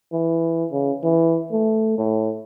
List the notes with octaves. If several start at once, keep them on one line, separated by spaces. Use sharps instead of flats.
E3
C#3
E3
A3
A2